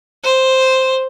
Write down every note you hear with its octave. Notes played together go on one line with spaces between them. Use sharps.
C5